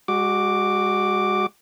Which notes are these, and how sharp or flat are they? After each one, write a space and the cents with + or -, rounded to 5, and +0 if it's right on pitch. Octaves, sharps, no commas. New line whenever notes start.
G#3 -35 F#4 +0 D6 +0